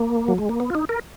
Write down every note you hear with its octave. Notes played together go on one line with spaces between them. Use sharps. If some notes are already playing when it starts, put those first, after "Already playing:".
Already playing: A#3
F#3
G#3
A#3
B3
F4
D#4
A#4